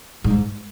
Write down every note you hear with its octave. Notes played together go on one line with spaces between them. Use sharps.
G#2